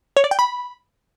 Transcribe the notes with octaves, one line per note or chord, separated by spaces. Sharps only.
C#5
D5
G5
B5